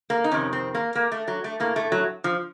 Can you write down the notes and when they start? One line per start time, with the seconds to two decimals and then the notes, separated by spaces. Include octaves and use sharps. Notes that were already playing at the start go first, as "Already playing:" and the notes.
0.10 A#3
0.24 D#4
0.31 F2 C3 D#3 C#4
0.53 C4
0.75 A#3
0.95 A#3
1.12 A3
1.28 F#3
1.44 A3
1.60 A2 A#3
1.76 A3
1.92 F#3
2.24 F3